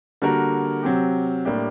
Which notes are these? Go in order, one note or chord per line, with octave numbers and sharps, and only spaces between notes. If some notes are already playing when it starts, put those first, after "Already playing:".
D3 G3 A#3 F#4 A#4
C3 F#3 C4 G4
A2 G3 A#3 D4 G4